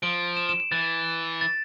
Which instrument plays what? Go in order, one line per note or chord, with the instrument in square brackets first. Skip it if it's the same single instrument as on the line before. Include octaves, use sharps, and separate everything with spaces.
[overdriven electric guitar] F3 [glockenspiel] D7
[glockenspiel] E7
E7
E7
[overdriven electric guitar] E3 [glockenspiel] A6
[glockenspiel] A6